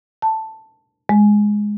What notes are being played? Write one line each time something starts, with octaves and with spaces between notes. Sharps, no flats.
A5
G#3